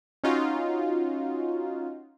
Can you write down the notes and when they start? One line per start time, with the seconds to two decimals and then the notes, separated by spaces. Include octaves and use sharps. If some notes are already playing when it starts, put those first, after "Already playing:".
0.24 C#4 D#4 F4 F#4